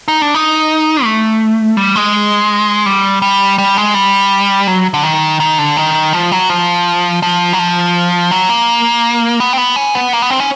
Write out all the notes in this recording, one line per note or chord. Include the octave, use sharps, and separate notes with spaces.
D#4
D4
D#4
A3
G3
G#3
G3
G3
G3
G#3
G3
F#3
D3
D#3
D#3
D3
D#3
F3
F#3
F3
F3
F#3
F3
F#3
A#3
B3
C4
B3
C#4
B3
A#3
B3
C4
C#4